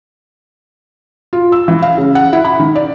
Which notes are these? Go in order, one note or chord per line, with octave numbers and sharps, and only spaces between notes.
F4
E6
E3
F5
C#3
F#5
E4
B5
D#3
D5